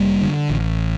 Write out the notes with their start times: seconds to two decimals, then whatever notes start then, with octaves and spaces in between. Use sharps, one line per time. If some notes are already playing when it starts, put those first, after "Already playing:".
Already playing: F1 G3 A#3
0.21 D3
0.50 A1